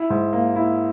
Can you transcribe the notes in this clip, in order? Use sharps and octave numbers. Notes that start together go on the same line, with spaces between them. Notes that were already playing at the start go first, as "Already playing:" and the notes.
Already playing: E4
G#2
A#3
E4